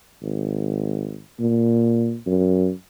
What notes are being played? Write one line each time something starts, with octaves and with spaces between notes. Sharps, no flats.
G#1
A#2
F#2